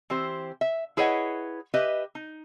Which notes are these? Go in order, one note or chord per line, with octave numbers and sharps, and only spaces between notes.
E3 C4 G4 C5
E5
E4 G#4 B4 C#5 D#5 F#5
G4 B4 D#5 E5
D#4